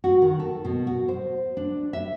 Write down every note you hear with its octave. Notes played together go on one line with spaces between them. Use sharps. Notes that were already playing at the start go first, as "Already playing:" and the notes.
F#4
D#3
A4
B2
F#4
C5
D4
E5